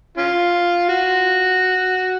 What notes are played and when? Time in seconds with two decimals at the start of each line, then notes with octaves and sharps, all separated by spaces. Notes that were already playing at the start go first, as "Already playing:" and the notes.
0.17 C#4 F4
0.89 F#4